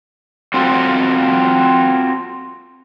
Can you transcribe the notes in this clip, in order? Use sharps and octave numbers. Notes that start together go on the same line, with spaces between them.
C4 F4 F#4 A4